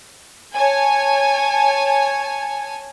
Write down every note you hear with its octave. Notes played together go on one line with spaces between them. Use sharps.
C#5 G#5 A5